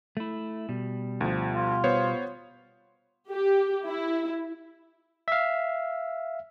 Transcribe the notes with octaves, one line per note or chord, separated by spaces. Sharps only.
A3 E4
B2 G3
D2 F3
F4
B3 C5 C#5
G4
E4
E5 F5